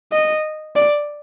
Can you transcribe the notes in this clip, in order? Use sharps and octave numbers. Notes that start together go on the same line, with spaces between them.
D#5
D5